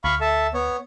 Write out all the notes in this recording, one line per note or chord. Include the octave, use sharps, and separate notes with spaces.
D2 F5 B5 C#6
A4 E5 A5
B3 C#5